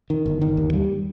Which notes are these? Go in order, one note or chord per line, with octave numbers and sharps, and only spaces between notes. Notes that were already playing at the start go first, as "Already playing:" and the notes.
D#3
G1
D#3
D#2
G3